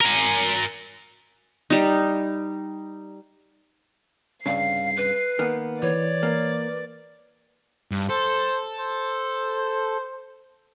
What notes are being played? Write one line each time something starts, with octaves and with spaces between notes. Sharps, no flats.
A#4 G#5
G3 D#4
C2 G2 C#3 F5 C7
B4
D#3 A#3 B3
E3 B4 C#5 D5 D6
A#3
G2
A4 C5
C5